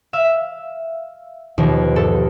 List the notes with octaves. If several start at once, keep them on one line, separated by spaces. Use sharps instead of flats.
E5 F5 E6
D#2 B2 F3
G2 A4